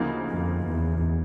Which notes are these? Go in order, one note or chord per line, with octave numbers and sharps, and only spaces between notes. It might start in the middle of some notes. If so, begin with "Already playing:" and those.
Already playing: D2 C#3 F3 A#3 D#4
F2
E2